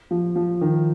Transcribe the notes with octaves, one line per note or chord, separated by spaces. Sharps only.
F3
F3
D#3